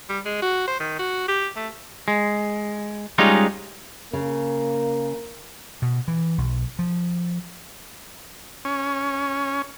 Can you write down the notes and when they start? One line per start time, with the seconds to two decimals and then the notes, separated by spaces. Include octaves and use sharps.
0.09 G3
0.26 G#3
0.42 F#4
0.68 C5
0.80 D#3
0.99 F#4
1.28 G4
1.56 A3
2.08 G#3
3.18 G3 G#3 C#4 D#4 F4
4.13 C#3 A#3
5.82 B2
6.08 E3
6.38 B1
6.79 F3
8.65 C#4